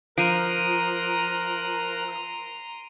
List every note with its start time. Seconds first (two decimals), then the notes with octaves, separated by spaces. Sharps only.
0.18 F3 A#4 A#5 C6 F#6 D7 D#7